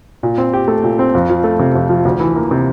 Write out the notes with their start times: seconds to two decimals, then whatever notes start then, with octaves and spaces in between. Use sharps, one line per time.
0.23 A#2
0.38 C4
0.53 G4
0.68 A3
0.84 A#2
0.99 C4
1.14 F2
1.30 F3
1.44 A3
1.59 C3
1.75 F2
1.89 F3
2.05 D2
2.20 E3
2.36 A#3
2.51 C3